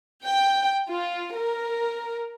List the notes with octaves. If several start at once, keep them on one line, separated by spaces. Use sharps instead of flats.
G5
F4
A#4